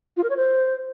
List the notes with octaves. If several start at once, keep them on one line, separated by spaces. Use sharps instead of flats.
F4
A#4
C#5
C5